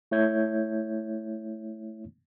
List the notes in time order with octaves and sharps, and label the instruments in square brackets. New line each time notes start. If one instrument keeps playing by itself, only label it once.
[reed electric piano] A3 E4 C#5 E5 G6 G#6